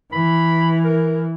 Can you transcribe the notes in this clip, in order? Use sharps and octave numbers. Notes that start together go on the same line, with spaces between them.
E3 B5
A#4